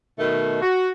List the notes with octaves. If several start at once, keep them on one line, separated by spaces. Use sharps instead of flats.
B2 D#3 A3
F#4